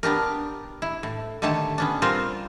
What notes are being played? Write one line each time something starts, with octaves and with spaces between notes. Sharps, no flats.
B3 D4 G4 A#4
E4
A2
D3 D#3 A3 G4 C#5 A5
B3 C#4 D4
G3 C4 F4 A#4 C5